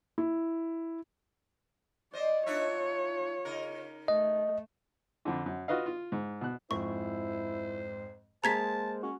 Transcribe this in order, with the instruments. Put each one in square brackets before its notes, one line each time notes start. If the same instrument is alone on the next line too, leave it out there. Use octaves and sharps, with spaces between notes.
[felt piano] E4
[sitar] C5 D#5 [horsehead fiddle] D5
[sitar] D4 D#4 E5 [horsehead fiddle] F4 C#5
[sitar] C#3 D#4 A#4
[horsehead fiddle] A3 [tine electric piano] D#5
[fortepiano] F2 D3
F#2
F4 F#4 B4 D#5 F5
F4
G#2
B2 F#6
[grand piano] F2 G#2 [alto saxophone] E4 [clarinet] C5 [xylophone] C#6
[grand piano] G#3 A#3 G#4 [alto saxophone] C5 [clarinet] A5 [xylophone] A#5 G#6 B6
[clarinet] C#4 [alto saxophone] F#4